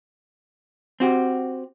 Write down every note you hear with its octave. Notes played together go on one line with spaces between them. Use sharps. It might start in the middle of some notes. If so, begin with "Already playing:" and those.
C4 F#4 G4